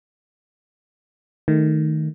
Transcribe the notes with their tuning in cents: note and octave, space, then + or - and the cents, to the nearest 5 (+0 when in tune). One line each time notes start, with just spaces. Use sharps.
D#3 +0 A3 +0